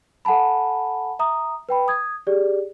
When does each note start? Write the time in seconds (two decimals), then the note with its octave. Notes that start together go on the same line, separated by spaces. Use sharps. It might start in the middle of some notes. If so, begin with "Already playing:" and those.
0.25 A4 F#5 G#5 A5 B5
1.19 E5 A#5 D#6
1.69 B4 G5 B5
1.88 D#6 G#6
2.27 G4 G#4 D5